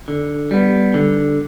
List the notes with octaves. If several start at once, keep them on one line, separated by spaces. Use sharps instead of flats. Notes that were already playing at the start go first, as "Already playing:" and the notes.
D3
G3 B3
D3